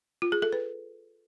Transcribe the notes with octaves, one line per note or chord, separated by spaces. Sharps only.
F4
G#4
A4
B4